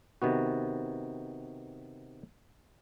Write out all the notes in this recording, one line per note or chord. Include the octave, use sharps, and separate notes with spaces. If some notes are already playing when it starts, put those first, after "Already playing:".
C3 D#3 B3 F#4